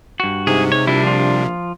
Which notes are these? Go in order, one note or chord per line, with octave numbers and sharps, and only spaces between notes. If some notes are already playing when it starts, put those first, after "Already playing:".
G2 F#4
G#2 C3 G#4
G#2 C#5
A#1 G3 D4 E4
F3 F4